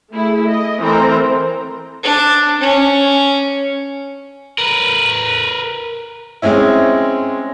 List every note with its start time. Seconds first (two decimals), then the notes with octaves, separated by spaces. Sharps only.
0.11 A3 E4 G#4
0.46 D#5
0.80 E3 A3 C4 A#4 C5 A#5
2.03 D4
2.60 C#4
4.58 A#4 B4
6.42 G#3 C4 C#4 E4